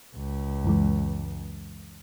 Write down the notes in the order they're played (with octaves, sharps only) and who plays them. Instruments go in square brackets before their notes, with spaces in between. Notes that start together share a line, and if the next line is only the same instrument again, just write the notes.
[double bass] C#2
[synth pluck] F#2 E3 G#3